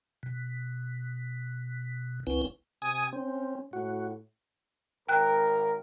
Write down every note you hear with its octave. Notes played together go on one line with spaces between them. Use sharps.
B2
F#1 C#2 C4 E4 B4
C3 G#5 D#6
C4 C#4
A2 F#4
G#1 A#4 G5 F#6